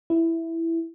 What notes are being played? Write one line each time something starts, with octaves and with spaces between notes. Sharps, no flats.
E4